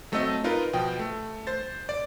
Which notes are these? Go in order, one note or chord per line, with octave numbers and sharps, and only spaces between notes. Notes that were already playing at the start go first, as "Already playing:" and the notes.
F#3 A3 C4 A4 D#5
D#4 F4 A#4 B4 D#5
B2 F3 G5
A3
C5 A6
D5